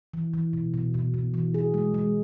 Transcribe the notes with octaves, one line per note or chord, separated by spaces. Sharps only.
E3
E3
B2
B2
B2
B2
E3
G#4
G#3
G#3